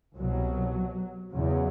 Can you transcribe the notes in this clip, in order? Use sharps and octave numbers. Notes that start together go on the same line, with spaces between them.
C2 B2 F#3
E2 C#3 F#3